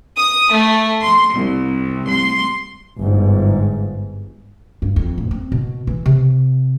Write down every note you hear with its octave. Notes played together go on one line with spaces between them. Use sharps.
D#6
A3
C6
C2
C6
G1 G#2
G2
F2
A#2
C4
B2
E3
C3